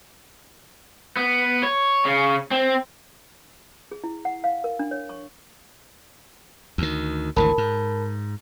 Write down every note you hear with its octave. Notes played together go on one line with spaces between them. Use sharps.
B3
C#5
C#3
C4
G#4
E4
F#5
F5
A#4
D4
C#5
C#6
D2 D#3
G#1 D2 E3 A#4 A5 B5
G#2